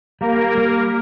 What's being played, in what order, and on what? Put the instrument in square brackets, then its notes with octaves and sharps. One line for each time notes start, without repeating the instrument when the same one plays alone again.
[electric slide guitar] G3 [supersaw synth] A#3 A#4
[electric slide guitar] G3